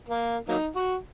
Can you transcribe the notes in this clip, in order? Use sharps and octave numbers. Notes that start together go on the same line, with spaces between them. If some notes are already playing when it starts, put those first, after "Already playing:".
A#3
F#3 A#3 D#4
F#4